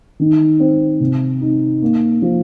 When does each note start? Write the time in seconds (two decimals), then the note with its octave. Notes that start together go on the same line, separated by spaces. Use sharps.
0.20 D#3
0.60 C4
1.00 C3
1.41 D#4
1.82 A#3
2.22 F3